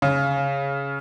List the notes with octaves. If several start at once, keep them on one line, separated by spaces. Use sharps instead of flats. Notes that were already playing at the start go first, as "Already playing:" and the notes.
C#3